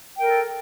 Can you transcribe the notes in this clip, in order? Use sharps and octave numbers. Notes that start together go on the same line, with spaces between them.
A4 A#4 G5